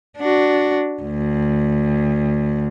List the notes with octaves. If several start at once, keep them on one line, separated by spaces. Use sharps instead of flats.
D4 F#4
D2